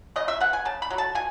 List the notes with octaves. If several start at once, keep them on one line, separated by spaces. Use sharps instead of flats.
C#3 D#5
E5
G#3 B3 F#5
G#5
C#3 A5
B5
F#3 A3
A5
B2 G#5